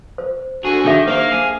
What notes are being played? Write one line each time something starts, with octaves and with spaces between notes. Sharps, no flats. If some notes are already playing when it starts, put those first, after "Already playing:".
C5
D3 F#4 G#4
D#3 D4 G#4 E5
A#3 C5 E5 F5
G#4